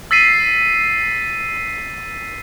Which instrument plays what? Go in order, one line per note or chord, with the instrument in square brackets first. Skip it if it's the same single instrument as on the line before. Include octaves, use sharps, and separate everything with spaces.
[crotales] E6 A6 B6 C7 D#7